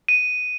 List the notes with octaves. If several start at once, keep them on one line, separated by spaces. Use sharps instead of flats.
D#7